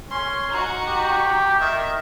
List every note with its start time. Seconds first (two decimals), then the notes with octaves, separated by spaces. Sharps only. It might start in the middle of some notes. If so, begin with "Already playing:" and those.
0.11 C#4 C6
0.49 D#4 F#4
0.87 G4
1.60 D#3 E5